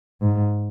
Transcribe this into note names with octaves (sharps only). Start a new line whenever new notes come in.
G#2